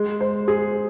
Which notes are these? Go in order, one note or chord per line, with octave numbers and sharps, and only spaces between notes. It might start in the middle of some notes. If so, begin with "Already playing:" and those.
Already playing: G#3
C5
G#4